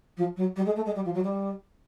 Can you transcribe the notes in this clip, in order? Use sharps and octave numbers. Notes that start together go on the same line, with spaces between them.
F3
F#3
G3
G#3
A3
G#3
G3
F3
F#3
G3